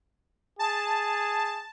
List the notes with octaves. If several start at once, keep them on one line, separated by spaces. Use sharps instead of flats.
G#4 A5